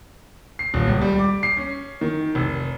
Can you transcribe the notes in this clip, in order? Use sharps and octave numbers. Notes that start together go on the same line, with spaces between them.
C7
D#1
C#2
G3
D6
C7
C#4
D#3
F1